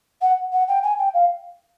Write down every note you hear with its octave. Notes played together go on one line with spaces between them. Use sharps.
F#5
F#5
G5
G#5
G5
F5